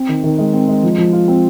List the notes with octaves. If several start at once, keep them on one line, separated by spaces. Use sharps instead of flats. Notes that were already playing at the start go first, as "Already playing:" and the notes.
Already playing: C4
D#3
D#3
G#3
C4
G#3
F3
F3
F4
C4